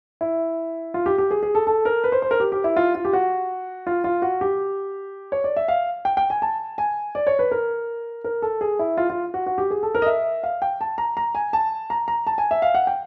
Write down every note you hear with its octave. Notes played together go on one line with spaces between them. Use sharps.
E4
F4
G4
G4
G#4
G#4
A4
A4
A#4
B4
C5
C5
A#4
G4
G4
E4
F4
F4
G4
F#4
F4
F4
F#4
G4
C#5
D5
E5
F5
G5
G5
G#5
A5
G#5
D5
C#5
B4
A#4
A#4
A4
G#4
E4
F4
F4
F#4
F#4
G4
G#4
A4
A#4
D#5
E5
F5
G5
A5
A#5
A#5
G#5
A5
A#5
A#5
A5
G#5
E5
F5
F#5
G5